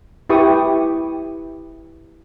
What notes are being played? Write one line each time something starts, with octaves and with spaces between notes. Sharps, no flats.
E4 G4 B4 G5 C#6 D#6